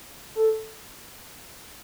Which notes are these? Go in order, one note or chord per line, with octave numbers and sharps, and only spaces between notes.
A4